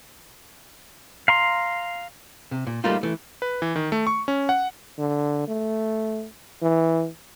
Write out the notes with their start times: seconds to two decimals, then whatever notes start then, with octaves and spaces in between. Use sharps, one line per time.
1.28 F5 A#5 C6
2.51 C3
2.67 A#2
2.84 G3 A3 A#3 D#4 F4
3.03 E3 A3
3.42 B4
3.62 E3
3.76 D#3
3.92 A3
4.07 C#6
4.28 C#4
4.49 F#5
4.98 D3
5.48 A3
6.62 E3